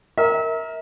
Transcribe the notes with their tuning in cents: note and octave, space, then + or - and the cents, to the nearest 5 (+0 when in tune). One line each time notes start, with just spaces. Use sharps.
A#4 +0 E5 -35